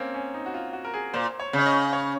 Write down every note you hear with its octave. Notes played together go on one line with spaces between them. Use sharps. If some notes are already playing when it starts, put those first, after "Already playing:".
Already playing: A#3 C4 C#4
C#4
D#4
F#4
F4
F#4
A#4
G#4
A#2 C5
C#5
C#3
C#5
D#5
C#5